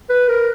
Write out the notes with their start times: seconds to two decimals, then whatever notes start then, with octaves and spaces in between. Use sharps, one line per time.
0.10 B4
0.29 A#4